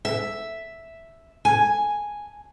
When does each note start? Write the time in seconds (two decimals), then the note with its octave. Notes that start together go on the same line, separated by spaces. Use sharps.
0.05 E5
1.45 G#5